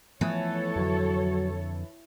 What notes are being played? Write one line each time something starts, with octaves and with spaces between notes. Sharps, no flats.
E3 F3 A3 B3 A4 C#5
F2 D3 F#3